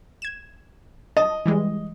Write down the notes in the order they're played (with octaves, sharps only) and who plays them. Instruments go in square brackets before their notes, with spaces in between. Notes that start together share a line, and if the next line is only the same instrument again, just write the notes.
[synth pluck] G#6 E7
[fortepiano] D#5 [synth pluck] A5
[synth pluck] E3 G3 G#3